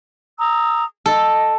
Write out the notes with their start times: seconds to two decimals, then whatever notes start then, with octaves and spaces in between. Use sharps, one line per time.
0.39 A#5 D#6 E6
1.06 A4 D#5